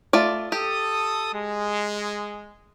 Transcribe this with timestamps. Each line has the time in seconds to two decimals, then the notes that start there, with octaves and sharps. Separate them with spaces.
0.13 A3 F4 D5
0.52 G4 A4 D#6
1.34 G#3